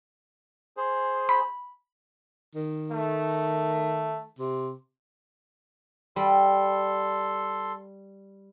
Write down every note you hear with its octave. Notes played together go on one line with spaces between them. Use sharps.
G#4 C5
B5
D#3
A3
C3
G3 A4 C6